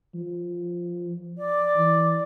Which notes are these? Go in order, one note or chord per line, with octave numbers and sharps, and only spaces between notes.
F3
D5
E3